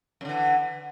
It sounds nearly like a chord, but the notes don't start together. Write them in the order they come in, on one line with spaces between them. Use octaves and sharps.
F#2 D3 E3